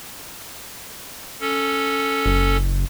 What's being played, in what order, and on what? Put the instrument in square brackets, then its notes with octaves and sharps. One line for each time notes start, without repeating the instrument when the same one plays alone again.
[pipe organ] C#4 A4
[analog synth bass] F#1